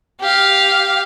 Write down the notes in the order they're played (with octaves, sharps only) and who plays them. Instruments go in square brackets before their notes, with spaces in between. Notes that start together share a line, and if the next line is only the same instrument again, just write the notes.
[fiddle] G4 F5